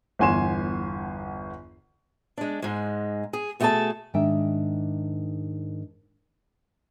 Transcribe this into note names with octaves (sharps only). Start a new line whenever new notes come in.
G1 E2 G#5 C6 E7
G#3 D4
G#2 G#3
G#4
B2 A3 F#4 G#4 A4 A5
G#2 D#3 D4 E5 G5